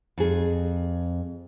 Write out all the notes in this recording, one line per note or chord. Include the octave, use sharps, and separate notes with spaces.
F2 G#4